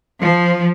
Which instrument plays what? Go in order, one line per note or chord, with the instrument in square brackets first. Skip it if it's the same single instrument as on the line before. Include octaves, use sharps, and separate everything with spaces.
[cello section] F3